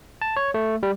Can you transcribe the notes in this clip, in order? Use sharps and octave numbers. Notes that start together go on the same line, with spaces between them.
A5
C#5
A3
G3